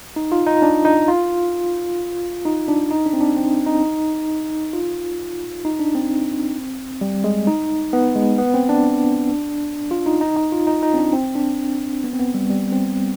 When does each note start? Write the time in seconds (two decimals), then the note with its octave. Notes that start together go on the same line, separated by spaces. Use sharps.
0.16 D#4
0.32 F4
0.46 D#4
0.62 D4
0.85 D#4
1.08 F4
2.45 D#4
2.68 D4
2.90 D#4
3.06 D4
3.13 C4
3.21 D4
3.36 C4
3.66 D#4
4.73 F4
5.65 D#4
5.79 D4
5.95 C4
7.01 G3
7.24 G#3
7.47 D#4
7.93 B3
8.16 G#3
8.38 B3
8.54 C4
8.69 D4
9.91 F4
10.06 D#4
10.21 D#4
10.37 D#4
10.52 F4
10.67 D#4
10.83 D#4
10.94 C4
10.98 D4
11.13 C4
11.35 D4
12.04 B3
12.13 C4
12.19 B3
12.34 G3
12.50 G3
12.72 C4